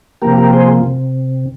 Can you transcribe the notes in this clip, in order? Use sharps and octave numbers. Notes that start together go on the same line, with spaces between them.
C3 F3 A#3 G4 A#4
G4 A#4
G#4 C5
C3